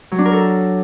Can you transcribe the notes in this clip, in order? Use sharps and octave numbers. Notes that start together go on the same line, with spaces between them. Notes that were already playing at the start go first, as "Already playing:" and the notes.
F#3
D4
A#4
A4